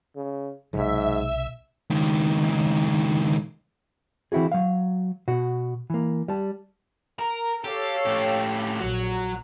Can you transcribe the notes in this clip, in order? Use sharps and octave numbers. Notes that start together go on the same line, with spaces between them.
C#3
B1 G#2 C3 F#3 E5
C#2 D#3
E3 C4 E4 F#4 G#4
F#3 F5
B2 F#4
E3 A#3
G3 A5
A#4
G4 A4 C#5 F5
A2 G4
A#1 F#3 F#4